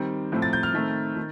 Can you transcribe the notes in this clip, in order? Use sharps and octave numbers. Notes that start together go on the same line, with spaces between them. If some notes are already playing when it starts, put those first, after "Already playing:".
Already playing: D#3 G3 C4
A2 F3 A3 C4
A6
G6
F6
D#3 A3 C4
D#3